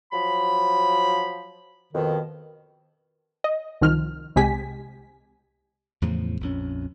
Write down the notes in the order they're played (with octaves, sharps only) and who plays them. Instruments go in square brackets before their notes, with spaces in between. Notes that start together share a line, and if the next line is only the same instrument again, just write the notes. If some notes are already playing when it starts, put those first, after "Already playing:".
[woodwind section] F3 F#3 B5
F2 B2 D#3
[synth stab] D#5
C2 D#3 F3 F6
C2 C3 G#3 G4 G#5 B6
[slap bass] E2 A2 C#3 F3
A#1 F2 C#4